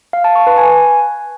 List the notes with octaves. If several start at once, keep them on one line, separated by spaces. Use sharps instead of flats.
F5
A5
C#6
B4
G#5